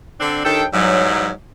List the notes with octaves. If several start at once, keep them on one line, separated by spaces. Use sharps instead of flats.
D3 C4 D4
D#2 D#3 D4 A4 G5
G#2 E3 F#3 G3